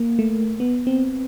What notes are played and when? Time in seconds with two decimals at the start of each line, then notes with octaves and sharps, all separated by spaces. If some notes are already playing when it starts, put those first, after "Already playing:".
Already playing: A#3
0.19 A3
0.60 B3
0.87 C4